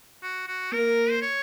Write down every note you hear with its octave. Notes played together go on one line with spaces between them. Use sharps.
F#4
F#4
A#3 A#4
C5
C#5